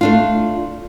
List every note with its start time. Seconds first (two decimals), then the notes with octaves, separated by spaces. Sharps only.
0.01 A3 D4 F4